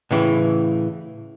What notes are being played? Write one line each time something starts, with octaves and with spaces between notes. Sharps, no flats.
A2 C#3 E3